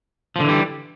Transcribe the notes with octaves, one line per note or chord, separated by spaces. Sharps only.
D3 E3 F3 G3